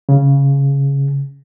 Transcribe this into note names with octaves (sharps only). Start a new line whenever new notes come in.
C#3